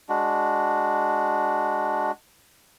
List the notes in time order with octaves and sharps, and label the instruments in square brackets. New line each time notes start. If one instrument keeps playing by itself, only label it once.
[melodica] G#3 D4 F#4